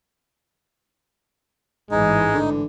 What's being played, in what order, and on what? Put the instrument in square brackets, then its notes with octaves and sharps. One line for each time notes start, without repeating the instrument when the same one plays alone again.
[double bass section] A1 G#2 E3 [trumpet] G#3 [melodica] D#4
[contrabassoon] D3